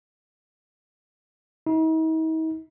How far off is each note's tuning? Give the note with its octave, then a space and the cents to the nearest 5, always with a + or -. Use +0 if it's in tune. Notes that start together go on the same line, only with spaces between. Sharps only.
D#4 +45